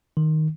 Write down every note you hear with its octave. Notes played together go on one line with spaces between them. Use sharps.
D#3